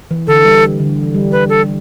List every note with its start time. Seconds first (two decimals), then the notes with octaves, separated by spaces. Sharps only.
0.11 E3
0.27 D3 A4
0.45 G3
0.80 D3
1.03 E3
1.15 G3
1.32 B4
1.49 A4